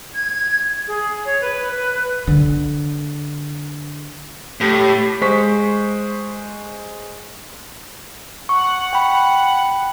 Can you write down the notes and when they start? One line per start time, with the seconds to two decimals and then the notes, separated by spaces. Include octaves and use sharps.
0.15 G#6
0.87 G#4
1.25 C#5
1.41 B4
1.71 B4
2.27 D3
4.61 A2 G4
5.21 G#3 C5 C#6 B6
8.49 F#5 C#6
8.93 G5 B5